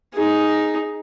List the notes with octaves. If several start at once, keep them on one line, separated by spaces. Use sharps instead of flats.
D#4 G#4